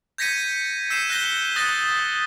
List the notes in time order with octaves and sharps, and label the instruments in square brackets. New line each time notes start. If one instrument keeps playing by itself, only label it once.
[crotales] G6 G#6 A#6 B6 C#7 D#7
E6 G6 B6 C7 D#7 E7
F#6 G6 A#6 G7
D#6 F#6 A6 A#6